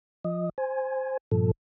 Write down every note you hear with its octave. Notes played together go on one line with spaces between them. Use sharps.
F3 D#5
C5 G#5
G2 A#2 F3 A4